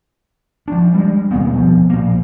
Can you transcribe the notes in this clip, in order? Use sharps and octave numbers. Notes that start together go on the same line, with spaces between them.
F3 D4
G3 G#3
D#2 B2 A#3 C4
B2 F3
A#1 A#3